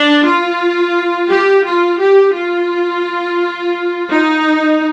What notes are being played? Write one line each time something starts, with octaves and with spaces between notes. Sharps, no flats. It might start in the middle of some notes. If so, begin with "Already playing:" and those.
Already playing: D4
F4
G4
F4
G4
F4
D#4